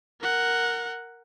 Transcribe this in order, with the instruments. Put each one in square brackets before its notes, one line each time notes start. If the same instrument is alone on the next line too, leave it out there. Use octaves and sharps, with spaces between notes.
[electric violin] A#4 F#5